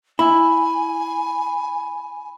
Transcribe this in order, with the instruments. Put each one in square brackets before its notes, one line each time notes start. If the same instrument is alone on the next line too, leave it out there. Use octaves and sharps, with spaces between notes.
[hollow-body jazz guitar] E4 [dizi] G#5 [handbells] B5